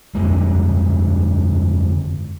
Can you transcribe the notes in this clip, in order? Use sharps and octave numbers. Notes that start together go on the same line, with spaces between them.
G1 C2 F2 G#3